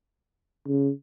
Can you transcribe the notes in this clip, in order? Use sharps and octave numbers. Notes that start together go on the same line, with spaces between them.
C#3